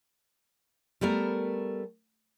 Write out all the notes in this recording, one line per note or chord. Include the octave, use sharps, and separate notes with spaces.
G3 A3 B3 A#4